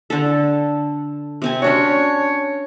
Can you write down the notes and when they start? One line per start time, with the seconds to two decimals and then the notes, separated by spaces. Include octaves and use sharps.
0.10 D3 A4
1.42 C3 C4 G#5
1.62 C#4 D4 F#4 C#5